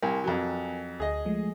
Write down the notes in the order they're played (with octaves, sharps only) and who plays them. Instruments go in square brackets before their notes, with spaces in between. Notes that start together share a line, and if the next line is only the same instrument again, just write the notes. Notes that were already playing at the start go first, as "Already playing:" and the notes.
[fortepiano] C2 [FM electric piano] A#4 G#5
[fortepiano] F2 F#3
[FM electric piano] D2 [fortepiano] G#4 D#5
[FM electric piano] F3 G#3 A3